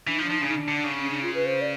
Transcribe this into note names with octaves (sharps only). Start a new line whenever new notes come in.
E3 D4
F3 D#4
D4
F3 D#4
C#3 D4
D#4
D4
D3
C#3
C#4
D4
F4
B4
C5
D5